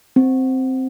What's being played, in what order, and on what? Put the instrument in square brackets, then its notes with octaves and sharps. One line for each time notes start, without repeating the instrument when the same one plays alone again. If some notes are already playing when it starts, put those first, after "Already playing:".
[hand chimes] C4